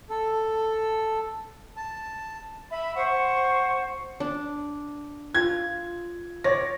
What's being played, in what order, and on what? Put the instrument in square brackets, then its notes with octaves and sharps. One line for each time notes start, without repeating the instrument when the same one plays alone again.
[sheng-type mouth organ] A4
A5
[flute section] E5 B5
C5 F#5 C#6
[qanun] D4
[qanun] F4 [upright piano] G#6
[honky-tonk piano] C#5 A#6 [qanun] D5